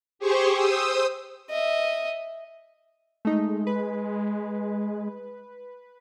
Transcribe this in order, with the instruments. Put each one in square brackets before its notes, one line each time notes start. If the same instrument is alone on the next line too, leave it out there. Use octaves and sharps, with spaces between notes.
[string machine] G4 G#4 C5 C#6
C5 D#6 E6
[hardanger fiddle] D#5 E5
[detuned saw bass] G#3 [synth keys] A3 D#4
[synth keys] B4